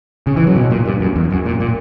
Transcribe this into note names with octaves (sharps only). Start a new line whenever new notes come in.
C#3
E3
F#3
B2
A#2
G2
F#2
E2
F#2
A#2
A#2